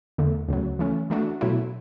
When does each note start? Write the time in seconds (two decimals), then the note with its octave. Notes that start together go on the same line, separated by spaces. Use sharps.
0.18 E2 D3 A3
0.49 D2 C#3 F#3
0.79 E3 A3 C#4
1.10 E3 A3 D4 F#4
1.41 B2 F#3 A3 E4